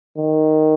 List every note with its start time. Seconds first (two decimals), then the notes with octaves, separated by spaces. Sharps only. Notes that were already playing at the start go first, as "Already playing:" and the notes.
0.18 D#3